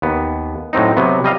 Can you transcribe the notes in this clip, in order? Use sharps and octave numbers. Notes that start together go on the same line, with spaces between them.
D#2 B3
A2 F#3 C4 D#4
C3 F#3 B3
G3 D#5 F5